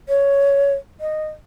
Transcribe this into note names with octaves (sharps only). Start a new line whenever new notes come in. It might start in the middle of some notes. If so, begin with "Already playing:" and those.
C#5
D#5